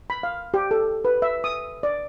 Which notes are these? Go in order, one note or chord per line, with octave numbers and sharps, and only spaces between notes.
B5
F5
G4
A4
B4
E5
D#6
D5